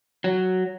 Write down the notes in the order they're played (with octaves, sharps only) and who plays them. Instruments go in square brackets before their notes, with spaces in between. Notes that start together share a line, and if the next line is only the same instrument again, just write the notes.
[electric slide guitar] F#3